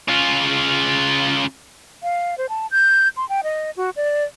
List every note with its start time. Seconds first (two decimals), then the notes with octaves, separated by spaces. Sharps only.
0.08 C#3 F4
2.03 F5
2.38 C5
2.49 A5
2.71 G6
3.17 C6
3.29 G5
3.43 D#5
3.77 F#4
3.96 D5